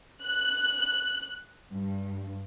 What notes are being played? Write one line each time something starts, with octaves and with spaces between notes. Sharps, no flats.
F#6
G2